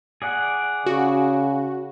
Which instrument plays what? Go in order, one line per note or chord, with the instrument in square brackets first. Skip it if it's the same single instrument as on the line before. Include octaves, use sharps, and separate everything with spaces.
[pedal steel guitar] G#4 D5 F#5
[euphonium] C#3 [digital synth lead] F#4